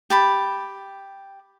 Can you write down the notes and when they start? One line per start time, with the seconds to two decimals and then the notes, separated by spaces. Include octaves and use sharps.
0.10 G4 A5 B5